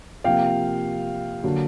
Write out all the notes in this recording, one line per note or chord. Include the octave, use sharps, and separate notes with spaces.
C3 F3 A#3 F5 G5
D3 F#3 A#3